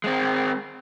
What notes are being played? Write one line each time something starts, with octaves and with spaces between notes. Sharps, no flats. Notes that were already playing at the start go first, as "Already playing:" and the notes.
G#3 C4